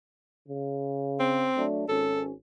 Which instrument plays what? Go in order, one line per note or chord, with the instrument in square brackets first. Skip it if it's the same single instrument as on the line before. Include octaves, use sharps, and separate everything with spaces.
[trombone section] C#3
[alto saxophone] C4
[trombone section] F#3 A3 D4
[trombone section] G#1 C#4 [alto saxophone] A4